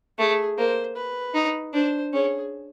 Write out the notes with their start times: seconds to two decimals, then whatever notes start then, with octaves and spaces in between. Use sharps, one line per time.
0.18 A3 G#4
0.57 A#3 C5
0.96 B4
1.34 D#4
1.73 D4 C5
2.13 C#4 G#4